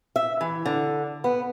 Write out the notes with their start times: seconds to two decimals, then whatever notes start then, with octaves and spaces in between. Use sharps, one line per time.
0.16 E5
0.41 E3
0.66 D3
1.24 B3